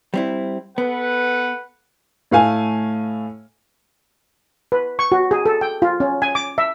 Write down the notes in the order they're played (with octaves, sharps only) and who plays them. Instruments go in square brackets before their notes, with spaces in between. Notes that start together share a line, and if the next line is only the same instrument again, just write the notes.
[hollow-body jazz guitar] G3 C4 E4
[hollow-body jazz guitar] B3 [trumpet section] A4 B4 F#5
[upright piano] A2 A3 F5 G#5
[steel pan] B4
C#6
F#4
G#4
A4
G5
F4
C#4
G#5
D6
E5